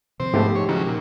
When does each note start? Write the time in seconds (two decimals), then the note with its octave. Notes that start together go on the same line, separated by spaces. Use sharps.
0.20 C3 D#3 F3 C4 C5
0.34 G#2 A3 B3 G4
0.55 C#5
0.69 C#3 F3 F#3 G#3 D#4
0.86 A#2 C#3